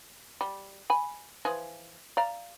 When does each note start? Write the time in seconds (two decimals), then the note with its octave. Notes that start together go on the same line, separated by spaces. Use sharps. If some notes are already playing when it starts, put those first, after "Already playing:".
0.41 G3
0.90 G#5 B5
1.45 E3 F3 G#4
2.17 D5 F5 A#5